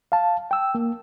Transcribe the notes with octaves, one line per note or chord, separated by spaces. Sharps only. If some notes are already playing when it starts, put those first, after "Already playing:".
F5 A5
G5 E6
A#3